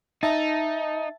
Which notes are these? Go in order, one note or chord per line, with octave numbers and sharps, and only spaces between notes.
D#4 E5 A5 A6